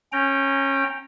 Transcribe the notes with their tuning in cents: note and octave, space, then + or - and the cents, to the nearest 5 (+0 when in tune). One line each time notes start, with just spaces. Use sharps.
C#4 -20 G5 +0 A#5 -10